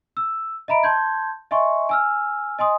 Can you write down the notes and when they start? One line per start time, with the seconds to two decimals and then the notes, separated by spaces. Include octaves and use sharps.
0.17 E6
0.68 D#5 E5 A#5 B5 D7
0.83 A5 C6 G6 G#6
1.51 D#5 E5 G#5 C6 C#6
1.89 G#5 E6 F6
2.59 D#5 G#5 C6 D#6